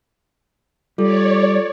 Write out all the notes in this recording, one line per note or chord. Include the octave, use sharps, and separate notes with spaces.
G3 F4 A4 C#5 D5